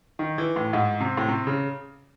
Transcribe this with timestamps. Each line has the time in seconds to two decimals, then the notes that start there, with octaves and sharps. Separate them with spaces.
0.19 D#3
0.38 E3
0.56 A2
0.73 G#2
1.01 C3
1.17 A2
1.28 C3
1.47 C#3